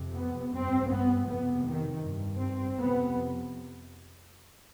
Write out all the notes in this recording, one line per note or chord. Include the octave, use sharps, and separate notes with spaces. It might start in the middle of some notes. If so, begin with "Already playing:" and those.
Already playing: F2 C3
B3
G2 C4
B3
F2 C3 B3
D#3
G2
C4
F2 C3 B3